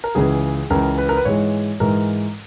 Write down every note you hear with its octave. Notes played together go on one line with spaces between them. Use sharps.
A#4
C#2 C#3 E3 G#4
C#2 C#3 E3 A#4
B4
A#4
B4
G#2 E3 G#3 C#5
G#2 E3 G#3 A#4